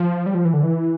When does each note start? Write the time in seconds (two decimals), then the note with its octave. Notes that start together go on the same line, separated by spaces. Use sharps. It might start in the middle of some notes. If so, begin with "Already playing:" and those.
Already playing: F3
0.26 G3
0.35 F3
0.45 E3
0.53 D3
0.63 E3